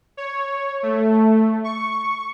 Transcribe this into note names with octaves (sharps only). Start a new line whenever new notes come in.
C#5
A3
C#6